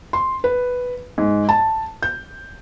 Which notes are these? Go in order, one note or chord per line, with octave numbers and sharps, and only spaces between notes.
C6
B4
G#2
A5
G6